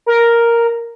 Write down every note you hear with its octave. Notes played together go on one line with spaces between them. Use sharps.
A#4